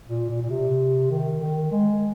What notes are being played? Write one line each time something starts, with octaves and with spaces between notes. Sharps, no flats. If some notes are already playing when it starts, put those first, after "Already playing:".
A#2
A#2
A#2
C3
D#3
D#3
G#3